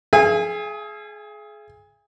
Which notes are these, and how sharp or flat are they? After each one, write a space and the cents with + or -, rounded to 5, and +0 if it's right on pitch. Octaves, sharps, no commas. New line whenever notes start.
G#4 +25 E5 +45 G#5 -30